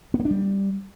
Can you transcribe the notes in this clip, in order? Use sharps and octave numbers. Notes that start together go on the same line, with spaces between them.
B3
A#3
D4
G3